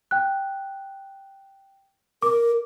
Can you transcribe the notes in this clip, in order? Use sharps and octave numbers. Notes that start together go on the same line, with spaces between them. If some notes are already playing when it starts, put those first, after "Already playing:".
G5 F#6
A#4 D6